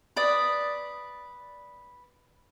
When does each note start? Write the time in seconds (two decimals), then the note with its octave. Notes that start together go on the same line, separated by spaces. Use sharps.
0.16 B4 D5 D#6